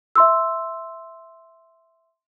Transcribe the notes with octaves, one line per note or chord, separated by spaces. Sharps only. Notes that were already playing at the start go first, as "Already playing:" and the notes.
E5 C6 E6